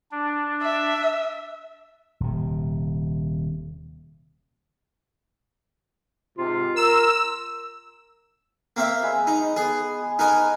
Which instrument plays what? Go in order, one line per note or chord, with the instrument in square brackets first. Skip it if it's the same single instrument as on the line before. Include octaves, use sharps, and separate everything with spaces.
[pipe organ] D4
[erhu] E5
[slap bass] D#1 C3
[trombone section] G#2 C3 [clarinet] F4
[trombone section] A#4 [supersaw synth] E6
[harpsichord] A#3 C4 E5
[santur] G#3 G#4 B4
[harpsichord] D#4
[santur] B3 [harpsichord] G#4
[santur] G#4
[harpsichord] D#4 A#4 G#5 [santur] B4